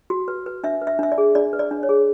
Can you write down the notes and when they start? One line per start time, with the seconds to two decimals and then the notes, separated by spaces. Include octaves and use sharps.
0.10 F#4
0.28 B4
0.46 B4
0.64 D4 E5
0.82 B4
0.87 E5
0.99 D4 E5
1.12 D5
1.18 G#4
1.35 D4 D5
1.53 B4
1.59 D5
1.71 D4
1.83 C#5
1.89 G#4